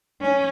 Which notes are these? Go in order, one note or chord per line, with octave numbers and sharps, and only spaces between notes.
C#4